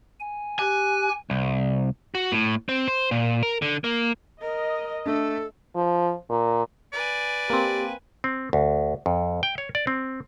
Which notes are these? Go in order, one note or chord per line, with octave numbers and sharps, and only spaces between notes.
G#5
G4 G#5 F#6
C2
F#4
A2
C4
C5
A#2
A#4
D3
A#3
A#4 D#5
A3 D4 A4
F3
A#2
B4 D5 G#5
A#3 C4 G4
C4
D2
F2
G5
C#5
D5
C4